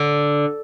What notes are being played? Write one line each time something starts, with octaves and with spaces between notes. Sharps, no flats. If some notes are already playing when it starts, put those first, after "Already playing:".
Already playing: D3